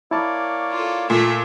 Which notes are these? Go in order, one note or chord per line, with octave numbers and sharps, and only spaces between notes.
A#3 E4 C#5 D5 A5 D6
F4 A4
A#2 A3 E5